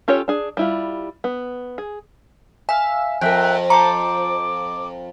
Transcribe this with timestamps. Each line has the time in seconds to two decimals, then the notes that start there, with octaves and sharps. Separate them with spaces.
0.08 C#4 F4 G4 A4 C#5
0.28 D4 G#4
0.57 G3 E4 F4
1.24 B3
1.78 G#4
2.69 E5 F5 G#5
3.21 F2 A#4 E5 G5 F#6
3.70 C5 A5 A#5 C#6 D6